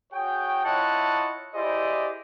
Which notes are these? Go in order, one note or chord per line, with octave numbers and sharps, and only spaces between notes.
F#4 G#4 C#5 G5
E4 F4 C#5 D#5 F#5 A5
E4 G4 G#4 C5 D5 D#5